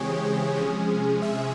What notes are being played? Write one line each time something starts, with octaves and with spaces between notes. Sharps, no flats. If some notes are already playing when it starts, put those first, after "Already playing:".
Already playing: C#3 E3 G#3 C4 G4 G#4 C#5
C3 F3 G#3 C#4 G#4
E5